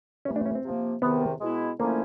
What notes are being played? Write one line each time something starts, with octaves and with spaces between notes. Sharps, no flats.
G2 E3 A3 C#4
D4
C#4
C4
C3 F3 A#3
E2 C3 D#3 B3
B2 G#3 B3 E4
D3 F3 A3 A#3 C#4 E4